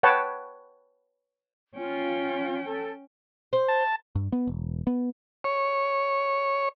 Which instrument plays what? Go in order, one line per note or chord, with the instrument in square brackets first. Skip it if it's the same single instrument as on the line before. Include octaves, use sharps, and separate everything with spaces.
[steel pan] B4 C#5 F#5 G5 A5
[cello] C#4 G5 [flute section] F4
[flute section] A4
[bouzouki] C5
[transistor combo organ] A5
[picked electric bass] G2
B3
E1
B3
[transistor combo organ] C#5